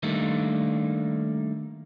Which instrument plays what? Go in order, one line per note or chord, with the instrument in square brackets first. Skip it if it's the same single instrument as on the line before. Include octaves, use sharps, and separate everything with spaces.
[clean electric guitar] D#3 G3 A3 A#3 D4 D#4